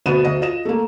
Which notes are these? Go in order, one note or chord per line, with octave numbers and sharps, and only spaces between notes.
D2 B2 B3 D#7 E7
D2 D#5
F4 D#5 E7
A3 A#3